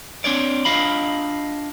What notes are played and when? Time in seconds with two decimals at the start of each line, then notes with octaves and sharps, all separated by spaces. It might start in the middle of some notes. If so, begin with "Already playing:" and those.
0.24 C4 D4 C#5 D5
0.65 D4 F4 D#5 F5 B5